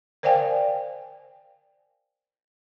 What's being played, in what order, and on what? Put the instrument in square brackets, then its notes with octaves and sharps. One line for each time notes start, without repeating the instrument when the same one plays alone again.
[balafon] A#4 C5 D5 F5 G5 G#5